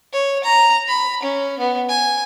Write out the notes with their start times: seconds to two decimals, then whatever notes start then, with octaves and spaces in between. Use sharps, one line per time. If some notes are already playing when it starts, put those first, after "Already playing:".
0.13 C#5
0.44 A#5
0.88 B5
1.23 C#4
1.59 B3
1.89 G#5